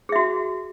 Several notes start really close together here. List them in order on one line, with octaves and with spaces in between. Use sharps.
G#4 E5 F#4